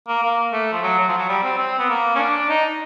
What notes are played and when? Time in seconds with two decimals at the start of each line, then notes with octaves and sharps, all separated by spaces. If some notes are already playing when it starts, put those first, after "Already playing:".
0.08 A#3
0.23 A#3
0.53 A3
0.73 F3
0.83 F#3
0.99 F#3
1.09 F3
1.18 F#3
1.29 G3
1.43 C4
1.58 C4
1.79 B3
1.90 A#3
2.15 C#4
2.19 D4
2.50 D#4